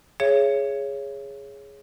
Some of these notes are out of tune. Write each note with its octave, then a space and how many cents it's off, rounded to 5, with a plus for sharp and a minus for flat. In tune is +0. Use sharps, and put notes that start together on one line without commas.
G#4 +0 C#5 +0 E5 +40